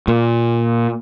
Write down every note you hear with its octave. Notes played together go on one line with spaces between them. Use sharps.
A#2